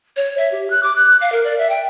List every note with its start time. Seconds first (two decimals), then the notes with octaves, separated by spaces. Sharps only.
0.17 C#5
0.38 E5
0.52 G4
0.70 F#6
0.83 D6
0.96 F#6
1.21 F5
1.32 A#4
1.44 D5
1.58 E5
1.70 G5